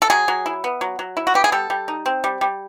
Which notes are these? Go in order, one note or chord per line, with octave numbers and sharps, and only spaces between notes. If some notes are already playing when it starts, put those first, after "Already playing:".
A4
F#3 G#4
F#3
E4
B3
F#3
F#3
E4
F#4
B3 G4
G#4
G3 A4
G3
D#4
C4
G3
G3